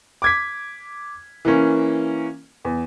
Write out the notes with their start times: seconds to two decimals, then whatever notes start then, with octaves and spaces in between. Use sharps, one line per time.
0.22 D6 G#6 B6
1.45 E3 A#3 C#4
2.65 E2